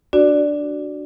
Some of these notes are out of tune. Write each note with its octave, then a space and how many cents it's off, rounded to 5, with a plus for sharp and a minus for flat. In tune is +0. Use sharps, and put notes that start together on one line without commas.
D4 +0 F#4 +0 D5 +0